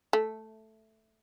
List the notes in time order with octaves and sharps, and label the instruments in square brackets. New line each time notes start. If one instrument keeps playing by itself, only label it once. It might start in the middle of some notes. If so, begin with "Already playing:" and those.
[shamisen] A3